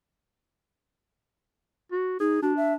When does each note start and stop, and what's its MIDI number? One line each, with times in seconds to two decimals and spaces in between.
1.92 2.18 66
2.20 2.39 63
2.20 2.38 68
2.42 2.76 62
2.42 2.53 66
2.57 2.73 76